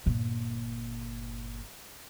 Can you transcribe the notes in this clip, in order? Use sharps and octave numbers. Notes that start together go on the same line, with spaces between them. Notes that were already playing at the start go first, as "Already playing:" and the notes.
G1 A#2